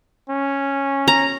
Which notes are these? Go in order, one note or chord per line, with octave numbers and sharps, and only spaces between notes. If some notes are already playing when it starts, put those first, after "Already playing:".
C#4
A#5